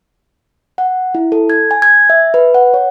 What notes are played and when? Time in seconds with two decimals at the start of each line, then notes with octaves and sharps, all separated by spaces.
0.78 F#5
1.15 E4
1.32 A4
1.50 G#6
1.71 G#5
1.82 G#6
2.10 E5
2.34 B4
2.54 F#5
2.74 C#5